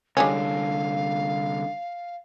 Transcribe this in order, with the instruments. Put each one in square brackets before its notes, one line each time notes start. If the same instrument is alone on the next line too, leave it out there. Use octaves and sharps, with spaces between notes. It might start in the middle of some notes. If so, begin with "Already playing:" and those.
[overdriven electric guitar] C2 D3 [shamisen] G3 G#3 C#4 [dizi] F5